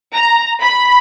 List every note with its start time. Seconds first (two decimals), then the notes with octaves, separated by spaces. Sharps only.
0.13 A#5
0.62 B5